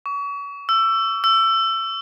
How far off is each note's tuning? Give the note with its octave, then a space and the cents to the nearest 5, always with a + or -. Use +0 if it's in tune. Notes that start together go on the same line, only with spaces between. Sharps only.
C#6 +35
E6 +20
E6 +20